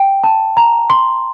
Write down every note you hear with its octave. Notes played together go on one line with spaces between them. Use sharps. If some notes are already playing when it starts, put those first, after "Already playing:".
Already playing: G5
A5
A#5
C6